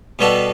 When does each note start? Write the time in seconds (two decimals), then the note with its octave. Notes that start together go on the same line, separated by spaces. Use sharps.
0.19 B2 G3 B3 F#4 A4